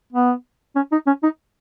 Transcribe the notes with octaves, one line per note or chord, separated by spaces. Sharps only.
B3
C#4
D#4
C#4
D#4